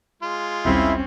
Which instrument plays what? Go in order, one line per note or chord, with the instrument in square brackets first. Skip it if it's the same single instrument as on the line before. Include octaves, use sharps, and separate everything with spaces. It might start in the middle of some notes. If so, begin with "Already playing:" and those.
[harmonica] G#3 F4
[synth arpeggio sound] A#1 D#2 G3 [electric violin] C4 C#4 [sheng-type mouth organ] E4 E5